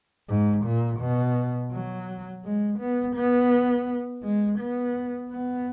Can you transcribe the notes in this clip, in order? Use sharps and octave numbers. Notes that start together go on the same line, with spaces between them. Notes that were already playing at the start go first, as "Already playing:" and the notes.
G#2
A#2
B2
F#3
G#3
B3
B3
G#3
B3
B3